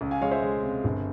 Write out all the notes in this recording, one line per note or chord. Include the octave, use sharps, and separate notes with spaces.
C#2
F5 G#5
G#3 C#5 F5
C5 E5
G#3
C3
G1